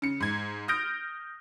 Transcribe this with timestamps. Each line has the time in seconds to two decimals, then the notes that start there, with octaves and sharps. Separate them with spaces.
0.02 C#3 C#7
0.20 G#2 G#6
0.68 D#6 F6 G6 A#6 D7